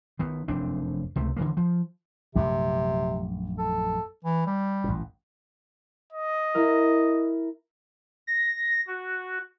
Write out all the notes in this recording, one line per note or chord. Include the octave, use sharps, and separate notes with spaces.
D#3 B3
F1 F#2 C4 D4
C#2 C3 A3
D3 E3 A#3
F3
A#1 F#2 C3 A3
A4
E3
G3
A1 F#2 A#2
D#5
E4 A#4 F5
A#6
F#4